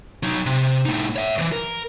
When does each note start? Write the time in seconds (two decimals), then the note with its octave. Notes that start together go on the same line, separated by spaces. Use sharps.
0.23 F#3 D#4
0.46 C3
0.85 A2 D#4
1.16 C#5 E5
1.38 D2 E3
1.52 A#4